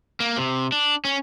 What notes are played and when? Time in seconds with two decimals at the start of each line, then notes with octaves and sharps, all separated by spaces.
0.20 A#3
0.37 C3
0.72 D4
1.05 C#4